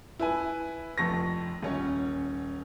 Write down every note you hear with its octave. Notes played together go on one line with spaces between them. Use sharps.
E4 B4 G#5
F1 F2 C#6 A#6
D#1 C#4 C#5